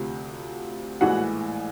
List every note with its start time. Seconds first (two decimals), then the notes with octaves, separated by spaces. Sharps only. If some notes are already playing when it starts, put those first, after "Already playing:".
Already playing: D2 C3 F3
1.01 A#1 A2 E3 G#3 F#4 F#5